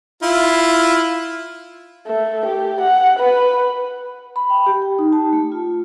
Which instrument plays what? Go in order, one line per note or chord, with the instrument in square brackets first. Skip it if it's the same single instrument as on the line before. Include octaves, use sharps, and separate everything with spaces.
[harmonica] E4 F4
[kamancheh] A3
G4
F#5
B4
[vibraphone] B5
G5
G4
G5
D#4
A5
A3
F4